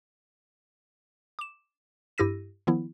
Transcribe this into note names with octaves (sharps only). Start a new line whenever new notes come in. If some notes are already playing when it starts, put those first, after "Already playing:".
D6 E7
G2 E4 G4 E6 A#6 D#7
D#3 F3 B3 E4